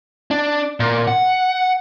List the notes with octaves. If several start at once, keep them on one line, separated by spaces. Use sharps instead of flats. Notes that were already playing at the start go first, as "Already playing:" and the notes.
D4
A#2
F#5